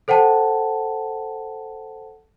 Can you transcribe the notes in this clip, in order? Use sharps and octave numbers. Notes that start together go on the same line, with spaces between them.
A4 C5 F#5 G5 A5